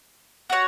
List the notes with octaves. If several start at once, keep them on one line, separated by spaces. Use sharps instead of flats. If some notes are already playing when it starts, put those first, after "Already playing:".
F#4 C#5 F#5